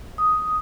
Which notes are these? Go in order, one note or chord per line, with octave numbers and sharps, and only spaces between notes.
D#6